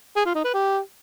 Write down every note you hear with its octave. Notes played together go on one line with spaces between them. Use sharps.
G#4
F4
D#4
B4
G4